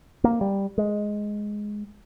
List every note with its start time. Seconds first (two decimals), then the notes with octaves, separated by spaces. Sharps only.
0.24 A#3
0.41 G3
0.78 G#3